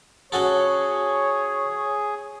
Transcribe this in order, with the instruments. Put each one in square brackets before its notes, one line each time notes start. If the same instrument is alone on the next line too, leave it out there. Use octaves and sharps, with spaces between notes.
[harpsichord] C#4 F#4 A4 [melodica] G#4 [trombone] C#5